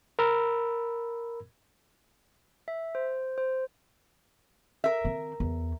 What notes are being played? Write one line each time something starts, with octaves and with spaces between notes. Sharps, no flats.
A#4 B5 E6
E5
C5
C5
A#4 E5
D#3 C4
E2